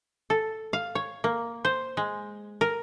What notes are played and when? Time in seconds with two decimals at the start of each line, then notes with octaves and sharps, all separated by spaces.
0.30 A4
0.73 F5
0.95 C#5
1.24 A#3
1.65 C5
1.97 G#3
2.61 A#4